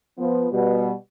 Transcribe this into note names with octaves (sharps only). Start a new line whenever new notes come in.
F3 B3
B2 G3